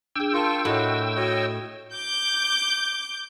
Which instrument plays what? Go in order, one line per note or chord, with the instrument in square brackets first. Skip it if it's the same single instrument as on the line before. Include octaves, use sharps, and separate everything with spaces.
[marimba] D4 G#4 [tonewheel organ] G5 E6
[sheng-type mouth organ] F4 C#6 [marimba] A#4 A5
[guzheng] A2 [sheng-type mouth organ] F#4 [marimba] C#5 D#5 G#6
[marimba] F#4 [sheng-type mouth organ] C#5 D#5
[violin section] D6 G6